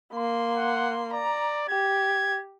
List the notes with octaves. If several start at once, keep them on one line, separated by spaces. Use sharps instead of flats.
A#3 C6
F#5
D5 A#5
G4 G#6